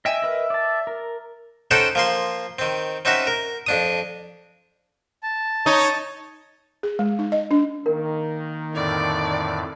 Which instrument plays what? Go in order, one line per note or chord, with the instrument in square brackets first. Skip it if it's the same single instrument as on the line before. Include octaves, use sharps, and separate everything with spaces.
[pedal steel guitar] D#5 G5 G#5 [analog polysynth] E5
[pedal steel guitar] A#4 B4 D#5
D5 A5
A#4
[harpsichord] C#4 D#4 A4 C5 F#5 G5
F3 A#3 C6
D#3 C4
C4 C#4 D#4 F#4 E5
A#4
F2 D4 D#6
[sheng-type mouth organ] A5
[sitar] D#4 [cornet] C#5
[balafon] G#4
G#3
D#4
D#5
D4
[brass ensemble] D#3 A#3 [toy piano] A#4
[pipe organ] F2 A2 D3 [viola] D5